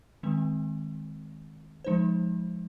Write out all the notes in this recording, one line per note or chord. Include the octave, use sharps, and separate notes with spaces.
D#3 G#3 C4
F3 G#3 D#4 C5